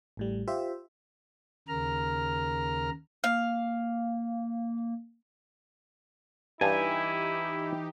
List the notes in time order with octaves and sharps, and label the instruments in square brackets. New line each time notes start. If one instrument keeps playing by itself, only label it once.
[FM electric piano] A1 A2 G3
F4 G4 C5 E5
[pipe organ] D#2 C#3 A#4 A#5 F6
[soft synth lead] A#3 [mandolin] F5
[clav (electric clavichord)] G2 A5 [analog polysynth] E3 D#4 G4 [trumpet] E4 [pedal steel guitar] G#5